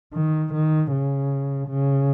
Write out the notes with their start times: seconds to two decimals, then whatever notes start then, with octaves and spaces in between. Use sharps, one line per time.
0.14 D#3
0.53 D#3
0.91 C#3
1.69 C#3